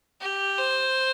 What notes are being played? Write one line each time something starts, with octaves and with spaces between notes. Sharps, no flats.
G4
C5